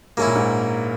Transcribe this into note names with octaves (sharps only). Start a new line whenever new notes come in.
G#2 A#3 C#4 E4
A#2
G#2